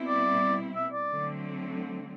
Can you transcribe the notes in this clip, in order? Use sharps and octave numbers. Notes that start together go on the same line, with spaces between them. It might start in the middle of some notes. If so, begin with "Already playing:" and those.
Already playing: B2 G3 C4 E4
D5
E5
D5
D3 F#3 A3 C4